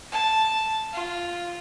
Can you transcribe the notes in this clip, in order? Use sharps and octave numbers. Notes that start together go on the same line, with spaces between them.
A5
F4